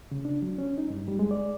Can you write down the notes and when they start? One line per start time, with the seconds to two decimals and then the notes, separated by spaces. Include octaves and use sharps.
0.11 C#3
0.25 D4
0.42 F#3
0.58 C#4
0.78 D#4
0.90 G2
1.08 G3
1.19 G#3
1.31 D5